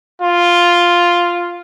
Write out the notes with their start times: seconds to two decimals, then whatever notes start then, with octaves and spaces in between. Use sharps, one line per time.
0.22 F4